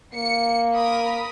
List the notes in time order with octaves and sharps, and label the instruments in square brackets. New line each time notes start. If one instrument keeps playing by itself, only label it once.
[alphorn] A#3 [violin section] C#7
[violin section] A#4 B5 D#6